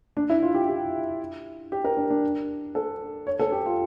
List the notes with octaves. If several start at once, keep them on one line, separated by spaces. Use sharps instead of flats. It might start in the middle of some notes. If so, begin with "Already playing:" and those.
D4
E4
F4
G4
G4
G4
A#4
D4
D4
A4
C#5
A4
G4
F4